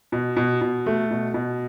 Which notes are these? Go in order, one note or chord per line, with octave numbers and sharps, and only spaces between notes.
B2
B2
B2
A3
B2
B2